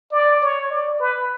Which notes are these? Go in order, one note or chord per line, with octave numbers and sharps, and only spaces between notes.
D5
C#5
D5
B4